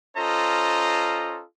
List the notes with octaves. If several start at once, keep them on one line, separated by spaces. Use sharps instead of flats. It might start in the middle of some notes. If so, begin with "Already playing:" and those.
C#4 F4 A4 C5 D#5 A#5